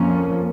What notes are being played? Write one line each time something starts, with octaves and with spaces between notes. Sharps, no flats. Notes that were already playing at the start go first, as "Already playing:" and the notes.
Already playing: F2 F3 A#3 C#4